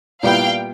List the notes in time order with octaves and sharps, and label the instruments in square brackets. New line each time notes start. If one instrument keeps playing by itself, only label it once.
[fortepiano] A#2 G3 B3 E4 [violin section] F5 G5